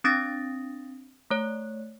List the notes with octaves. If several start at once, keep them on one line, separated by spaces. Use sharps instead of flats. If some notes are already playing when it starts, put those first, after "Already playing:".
C4 D4 D#6 A6 A#6 D7
A3 C#5